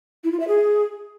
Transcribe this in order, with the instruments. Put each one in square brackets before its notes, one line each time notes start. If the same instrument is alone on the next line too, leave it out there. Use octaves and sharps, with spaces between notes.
[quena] E4
F4
E5
G#4